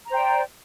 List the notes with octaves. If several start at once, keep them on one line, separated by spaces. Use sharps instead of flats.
C5 D5 G5 A#5